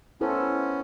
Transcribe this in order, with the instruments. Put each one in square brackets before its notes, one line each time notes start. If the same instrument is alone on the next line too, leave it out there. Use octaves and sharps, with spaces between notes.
[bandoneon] B3 C#4 [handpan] E4 A4 C5